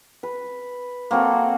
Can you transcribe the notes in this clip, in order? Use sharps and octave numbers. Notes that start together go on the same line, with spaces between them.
B4
A#3 C4 F#4 A4